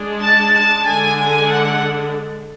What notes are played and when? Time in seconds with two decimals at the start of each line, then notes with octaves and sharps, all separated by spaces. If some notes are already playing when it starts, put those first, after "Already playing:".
Already playing: G#3 D4
0.22 A5
0.53 A5
0.84 D3 G#3 D4 G#5
1.16 G#5
1.47 F#5